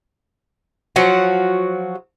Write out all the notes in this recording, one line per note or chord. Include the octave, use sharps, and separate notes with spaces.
F3 F#3 F#4